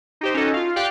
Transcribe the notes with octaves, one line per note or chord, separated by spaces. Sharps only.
D#4 G4 C5
C#4 D#4 F#4 A4 D#5
F4 F5
G4 D5 F5 G5 F#6